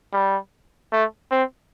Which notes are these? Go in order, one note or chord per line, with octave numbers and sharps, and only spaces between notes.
G3
A3
C4